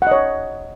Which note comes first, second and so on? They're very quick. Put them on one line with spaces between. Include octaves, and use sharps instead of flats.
F#5 D#5 C#5